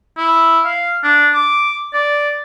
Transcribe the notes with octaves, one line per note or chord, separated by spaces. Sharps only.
E4
F5
D4
D6
D5